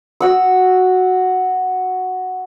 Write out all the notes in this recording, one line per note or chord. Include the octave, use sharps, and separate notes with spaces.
F#4 F#5 E6